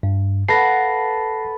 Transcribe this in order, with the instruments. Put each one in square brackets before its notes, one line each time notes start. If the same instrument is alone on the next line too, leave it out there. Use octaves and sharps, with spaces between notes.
[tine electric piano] G2
[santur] A4 B4 [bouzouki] F5 F#5 [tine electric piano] A#6 C7